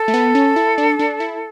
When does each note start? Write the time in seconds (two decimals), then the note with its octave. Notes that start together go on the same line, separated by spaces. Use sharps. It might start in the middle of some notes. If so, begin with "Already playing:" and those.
Already playing: A4
0.08 A3
0.14 B3
0.35 C#4
0.56 E4
0.78 D4
0.99 D4
1.20 E4